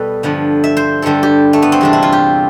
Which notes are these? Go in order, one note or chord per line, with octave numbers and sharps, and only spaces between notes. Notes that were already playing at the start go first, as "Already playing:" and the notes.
Already playing: B2 G3 A4 B4
G2 D3 F3
E5
C5
G2 D3 G3 A4
G4
A3
B3
C4
E2 C3 G3 D4
E4
F4
G4